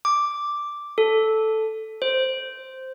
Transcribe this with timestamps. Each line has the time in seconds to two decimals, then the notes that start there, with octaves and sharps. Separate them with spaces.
0.05 D6
0.98 A4
2.02 C5